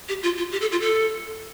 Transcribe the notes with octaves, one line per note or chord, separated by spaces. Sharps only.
G4
F4
F4
G4
A4
F4
A4